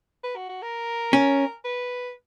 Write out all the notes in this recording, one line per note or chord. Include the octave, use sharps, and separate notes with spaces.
B4
F#4
F#4
A#4
C#4
B4